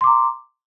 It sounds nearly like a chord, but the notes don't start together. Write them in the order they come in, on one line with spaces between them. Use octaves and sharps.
C6 D6 A#5